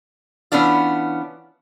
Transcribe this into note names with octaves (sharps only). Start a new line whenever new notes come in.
E3 B3 C#4 D4 F4